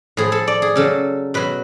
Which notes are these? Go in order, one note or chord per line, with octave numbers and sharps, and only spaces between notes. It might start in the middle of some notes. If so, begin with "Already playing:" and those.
A2 F3 G#4
A4
D5
G#4
C#3 F#3 A4
B2 F#3 B4